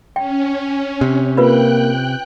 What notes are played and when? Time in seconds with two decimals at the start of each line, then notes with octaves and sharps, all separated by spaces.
0.16 C#4 G5
1.01 C3
1.37 A#3 F4 B4 G5 B5 F#6